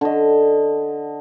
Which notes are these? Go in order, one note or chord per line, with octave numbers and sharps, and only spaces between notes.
D3 D#5